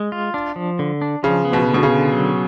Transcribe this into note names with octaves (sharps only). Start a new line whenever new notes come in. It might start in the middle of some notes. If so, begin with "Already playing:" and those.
Already playing: G#3
F4
D4
F3
D3
D4
C#3 F3
B3
B2
D3
B2
C#3
D3
F#3